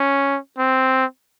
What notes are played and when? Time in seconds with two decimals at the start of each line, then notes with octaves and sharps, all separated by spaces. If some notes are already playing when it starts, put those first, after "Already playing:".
Already playing: C#4
0.58 C4